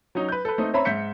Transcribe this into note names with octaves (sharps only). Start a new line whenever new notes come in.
F#3 C#4 D#4
B4 G6
A4 B4
A3 C4 D#4
C4 C#4 C#5 E5 A#5 B5
G#2 E5 G6 B6 C#7